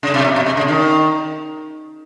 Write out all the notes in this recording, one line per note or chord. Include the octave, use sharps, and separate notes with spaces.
C#3
C3
B2
B2
C3
C#3
D#3